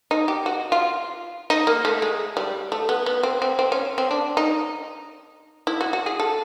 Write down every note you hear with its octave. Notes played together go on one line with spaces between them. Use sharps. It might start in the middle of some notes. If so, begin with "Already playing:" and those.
D#4
G4
F#4
F4
D#4
A#3
A3
G#3
G3
A3
B3
B3
C4
C4
C4
C#4
C4
D4
D#4
E4
F#4
F#4
G#4
A4